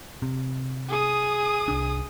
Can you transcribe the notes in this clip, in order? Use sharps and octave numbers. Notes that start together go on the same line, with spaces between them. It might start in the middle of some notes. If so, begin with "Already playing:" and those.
C3
G#4 D#6
C2 D4